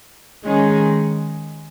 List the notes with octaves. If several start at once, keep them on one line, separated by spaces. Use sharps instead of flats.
D#3 G#3 C#4 G#4